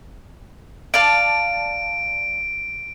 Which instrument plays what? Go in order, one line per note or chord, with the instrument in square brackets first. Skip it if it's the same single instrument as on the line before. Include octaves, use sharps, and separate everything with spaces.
[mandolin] D5 F5 A5 [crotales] D7